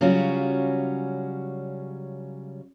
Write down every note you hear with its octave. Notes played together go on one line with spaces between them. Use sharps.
C#3 F#3 G3 C#4 F4 F#4